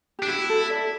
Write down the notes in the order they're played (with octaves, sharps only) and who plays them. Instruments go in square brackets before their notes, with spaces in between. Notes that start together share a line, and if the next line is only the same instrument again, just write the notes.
[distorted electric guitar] D4 [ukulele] G4
[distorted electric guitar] E4 [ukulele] F#4
[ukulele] A4
D5